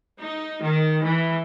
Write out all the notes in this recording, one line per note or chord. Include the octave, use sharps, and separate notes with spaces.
D#4
D#3
E3